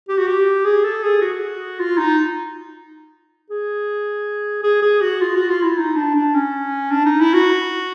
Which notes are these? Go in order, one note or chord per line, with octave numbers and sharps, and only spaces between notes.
G4
F#4
G4
G#4
A4
G#4
F#4
F4
D#4
G#4
G#4
G#4
F#4
F4
F#4
F4
E4
D#4
D4
D4
C#4
D4
D#4
E4
F#4